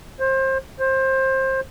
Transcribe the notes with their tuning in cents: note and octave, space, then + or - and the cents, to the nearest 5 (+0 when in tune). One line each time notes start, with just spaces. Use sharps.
C5 +25
C5 +20